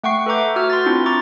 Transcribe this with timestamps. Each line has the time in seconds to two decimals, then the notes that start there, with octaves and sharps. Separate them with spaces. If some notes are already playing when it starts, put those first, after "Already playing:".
0.04 A3 F#5 G5 C#6 C7
0.26 A4 B4 E5 A#5 D6 G6
0.56 F#4 E6 F6
0.70 C6 A6
0.86 C4 D4 E4 F4
1.06 A#5 C#6 D6 A6